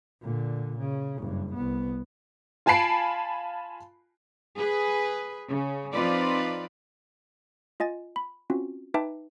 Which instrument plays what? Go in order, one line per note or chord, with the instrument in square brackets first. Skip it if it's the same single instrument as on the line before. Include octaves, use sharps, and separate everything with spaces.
[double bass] A#2 D3
C#3
F#1 G2
C2 B3
[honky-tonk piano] F4 G#5 A5 B5 C7 D7
[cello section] G#4 B4
C#3
F3 C4 D#4 F4 B4 D5
[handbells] F4 D#5 G#5 A6
B5
C4 C#4 F4 F#4
D#4 B4 E5 G5 A5 D6